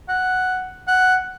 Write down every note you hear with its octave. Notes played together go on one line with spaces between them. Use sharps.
F#5
F#5